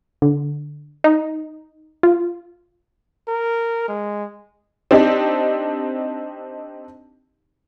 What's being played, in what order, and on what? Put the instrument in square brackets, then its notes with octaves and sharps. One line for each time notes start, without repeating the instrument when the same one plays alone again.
[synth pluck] D3
D#4
F4
[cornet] A#4
G#3
[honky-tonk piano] C4 D4 D#4 G4